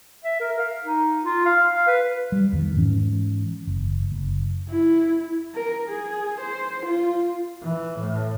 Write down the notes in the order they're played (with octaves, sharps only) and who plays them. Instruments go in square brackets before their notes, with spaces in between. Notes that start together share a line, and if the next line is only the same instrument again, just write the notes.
[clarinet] E5
A#4
F5
D#4
F4
F5
F5
B4
[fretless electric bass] G3
E2 D#3
G#2 E3 C#4
F#1
F#1
[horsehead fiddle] E4
A#4
G#4
C5
F4
[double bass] E3
A2